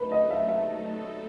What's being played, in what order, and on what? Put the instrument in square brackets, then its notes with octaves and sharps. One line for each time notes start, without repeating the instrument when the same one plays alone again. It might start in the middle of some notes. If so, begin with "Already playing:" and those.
Already playing: [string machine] F#3 A3 D#4 A4 [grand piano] B4
[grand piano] D#5
E5
E5